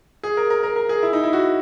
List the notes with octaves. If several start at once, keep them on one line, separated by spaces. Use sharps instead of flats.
G#4
A#4
A#4
A#4
A#4
G#4
E4
D#4
E4
F#4